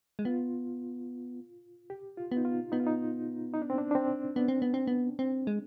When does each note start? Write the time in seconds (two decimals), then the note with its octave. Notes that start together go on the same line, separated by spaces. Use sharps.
0.19 G#3
0.25 B3 F4
1.90 G4
2.17 F4
2.32 B3
2.37 D#4
2.45 F4
2.72 B3 D#4
2.80 F4
2.87 D#4
3.54 D#4
3.62 D4
3.70 C4
3.78 D4
3.91 D4
3.95 C4
4.36 B3 D4
4.48 C4
4.62 B3
4.74 C4
4.87 B3
5.19 C4
5.47 G#3